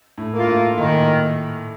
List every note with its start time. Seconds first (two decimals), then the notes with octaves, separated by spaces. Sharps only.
0.18 A2
0.33 A#3 F4
0.47 A2
0.78 A#2 D#3